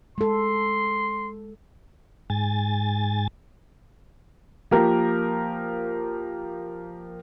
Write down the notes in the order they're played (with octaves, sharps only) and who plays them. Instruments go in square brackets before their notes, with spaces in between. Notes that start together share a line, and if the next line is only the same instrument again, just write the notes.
[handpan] G#3 A4 [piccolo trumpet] C6
[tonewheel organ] G#2 G#5 A6
[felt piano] F3 A#3 G4 A#4